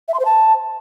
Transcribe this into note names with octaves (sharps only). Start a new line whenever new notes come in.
E5
C6
C5
A5